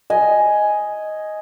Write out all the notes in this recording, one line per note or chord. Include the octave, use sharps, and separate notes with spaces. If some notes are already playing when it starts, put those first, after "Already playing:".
D#5 G#5